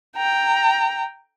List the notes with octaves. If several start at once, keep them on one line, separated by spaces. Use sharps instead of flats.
G5 A#5